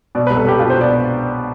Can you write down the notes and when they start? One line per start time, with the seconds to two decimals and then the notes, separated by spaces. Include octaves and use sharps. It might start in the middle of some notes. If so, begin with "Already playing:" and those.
0.15 B2 D5
0.27 B4
0.30 C2
0.37 A4
0.44 C2 G4
0.59 B2 F4
0.70 C5
0.74 B2
0.81 D5